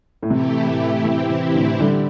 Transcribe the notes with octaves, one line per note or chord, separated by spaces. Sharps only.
A2
C3 E3 A3 E4 G4
A2
C3 E3 C4 E4 G4
C3
A2 D3
D3 G3